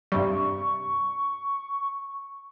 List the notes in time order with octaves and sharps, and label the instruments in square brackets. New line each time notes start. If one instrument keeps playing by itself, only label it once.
[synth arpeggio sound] G2 C3 G3 [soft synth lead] C#6